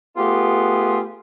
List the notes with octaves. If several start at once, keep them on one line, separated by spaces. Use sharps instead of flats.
A3 B3 F4 G4 G#4